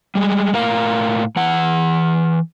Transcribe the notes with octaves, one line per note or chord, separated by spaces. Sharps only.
G3 G#3
A2 A#4 F5
E3 F#5